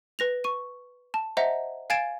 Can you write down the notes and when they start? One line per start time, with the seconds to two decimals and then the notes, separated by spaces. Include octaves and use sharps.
0.19 B4 A#6 F7
0.44 C#6 D#7
1.14 A5
1.37 C5 D#5 E5 F#5 A#5
1.90 F5 G#5 G#6 A6 D7 E7